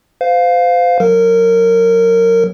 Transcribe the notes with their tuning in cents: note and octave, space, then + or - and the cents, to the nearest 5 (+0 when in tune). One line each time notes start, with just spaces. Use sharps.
C5 -35 F5 +10
F#3 -5 A#4 -20